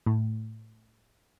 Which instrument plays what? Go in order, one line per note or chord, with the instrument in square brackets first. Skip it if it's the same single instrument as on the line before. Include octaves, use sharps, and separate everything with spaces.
[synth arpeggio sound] A2